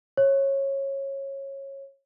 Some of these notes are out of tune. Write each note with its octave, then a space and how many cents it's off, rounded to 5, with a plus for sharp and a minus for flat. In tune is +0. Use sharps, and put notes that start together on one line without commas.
C#5 -20